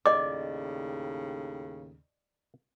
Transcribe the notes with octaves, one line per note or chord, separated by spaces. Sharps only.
D#2 A2 C#3 D5 D#5 D6